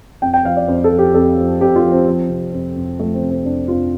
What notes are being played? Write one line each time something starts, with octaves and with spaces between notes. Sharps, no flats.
F2 G5
G5
F3 F5
D5
F2 C5
A4
F3
G4
F2 A4
F3
F2 G4
F4
F3
C4
F3
C3
F2
F2
F3 A3
C4
C3
C4
F2 D4
F2 F4